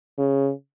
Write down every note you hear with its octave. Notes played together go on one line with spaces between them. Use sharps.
C#3